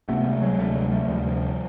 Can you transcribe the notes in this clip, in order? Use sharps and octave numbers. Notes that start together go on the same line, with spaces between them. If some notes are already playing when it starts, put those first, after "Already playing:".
C#2 C3 A3 B3
G3 A3
F#3 G#3
D2 C3 G3 A3
F#3 G#3
G3 A3
D2 C3 F3 G3